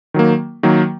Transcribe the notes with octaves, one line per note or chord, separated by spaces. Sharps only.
D#3 F#3 A#3
D#3 F#3 A#3